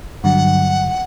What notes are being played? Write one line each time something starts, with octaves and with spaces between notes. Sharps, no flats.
G2 D3 F#3 F#5